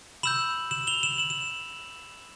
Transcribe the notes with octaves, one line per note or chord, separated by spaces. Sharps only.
B5 E6 G6 E7 F#7
E7 F#7
F7 G7
E7 F#7
E7 F#7
E7